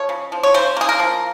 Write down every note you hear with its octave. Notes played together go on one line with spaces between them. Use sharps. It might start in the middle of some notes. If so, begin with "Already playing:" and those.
Already playing: F3 C#5
C#3
F3
C#5
C#3 C5
A#3 G#4
A#4
F3